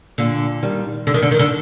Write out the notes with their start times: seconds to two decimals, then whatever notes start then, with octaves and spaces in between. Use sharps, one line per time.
0.18 A#2 D3
0.63 D#3 G3
1.07 D3
1.14 D#3
1.22 D3
1.31 D#3
1.39 D3